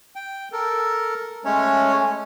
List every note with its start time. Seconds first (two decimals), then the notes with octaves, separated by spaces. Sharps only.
0.16 G5
0.52 A4 A#4
1.45 G#3 A3 C#4 C#5